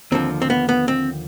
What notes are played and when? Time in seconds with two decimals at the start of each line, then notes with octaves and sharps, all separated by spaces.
0.12 D#2 D3 F3 C4
0.42 C4
0.50 B3
0.69 B3
0.88 C4